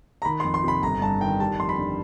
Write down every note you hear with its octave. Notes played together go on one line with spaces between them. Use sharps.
A#5
D#3 B5
F2 C6
C6
C3 B5
G1 A#5
G2 A5
D#3 G5
G3 A5
F2 C6
B5
D3